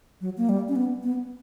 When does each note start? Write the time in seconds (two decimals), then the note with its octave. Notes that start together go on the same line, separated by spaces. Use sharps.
0.21 F#3
0.37 A#3
0.49 G3
0.69 C#4
0.76 B3
1.03 B3